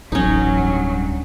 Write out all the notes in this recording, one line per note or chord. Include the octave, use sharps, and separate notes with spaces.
D1 A1 F#3 C#4 D#4 F4
G2